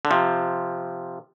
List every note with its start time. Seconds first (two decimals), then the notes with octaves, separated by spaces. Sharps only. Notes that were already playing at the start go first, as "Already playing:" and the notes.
0.05 D3
0.11 C3 F3